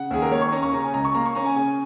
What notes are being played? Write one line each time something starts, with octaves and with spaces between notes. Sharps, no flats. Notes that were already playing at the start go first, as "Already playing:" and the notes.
Already playing: C#3 F#5
D#2 G#4
A#4
A#3 C#5
C#6
C#4 A#5
C#6
C#3 A#5
G#5
C#2 A#5
C#6
A#3 A#5
C#6
C#4 A#5
G#5
C#3 G#5